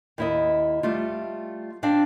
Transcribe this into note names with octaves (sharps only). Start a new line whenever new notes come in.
D#2 E4 D#5
G3 A3 F4
C4 D4 F5